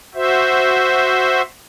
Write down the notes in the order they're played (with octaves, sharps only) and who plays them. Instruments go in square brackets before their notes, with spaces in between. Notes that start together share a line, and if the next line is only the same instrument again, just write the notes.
[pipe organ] F#4 C5 E5